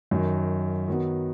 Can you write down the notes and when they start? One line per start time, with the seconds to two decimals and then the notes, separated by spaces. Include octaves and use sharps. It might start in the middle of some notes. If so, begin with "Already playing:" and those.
0.11 F#2 D#3 F#3
0.88 D#3 F#3 B3